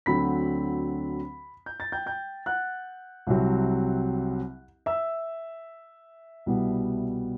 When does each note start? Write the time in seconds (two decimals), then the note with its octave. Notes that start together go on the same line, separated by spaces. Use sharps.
0.06 D2 D3 F#3 C4 B5 B6
1.66 G6
1.80 A6
1.92 G5 G6
2.06 G5 G6
2.46 F#5 F#6
3.27 C2 C3 F#3 C4
4.86 E5 E6
6.46 C2 B2 G3 B3